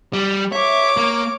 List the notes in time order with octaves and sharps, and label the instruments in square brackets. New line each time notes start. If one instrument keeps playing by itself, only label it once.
[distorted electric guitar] G3
[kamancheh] C#5 D6 [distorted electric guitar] E5
[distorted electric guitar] A#3